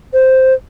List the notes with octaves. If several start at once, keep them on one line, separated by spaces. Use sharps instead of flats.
C5